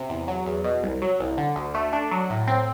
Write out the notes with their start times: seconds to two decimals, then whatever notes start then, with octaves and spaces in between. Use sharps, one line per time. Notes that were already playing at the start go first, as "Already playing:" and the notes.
Already playing: C3
0.09 E2
0.28 F#3
0.46 E2
0.64 B2
0.83 C2
1.02 F#3
1.20 C2
1.38 D3
1.56 D2
1.75 A3
1.93 D4
2.11 F#3
2.30 A2
2.48 C4